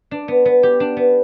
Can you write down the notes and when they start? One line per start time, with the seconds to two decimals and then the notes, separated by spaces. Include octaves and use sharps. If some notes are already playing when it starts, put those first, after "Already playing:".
0.11 D4
0.28 B3
0.45 B3
0.63 G4
0.80 D4
0.97 B3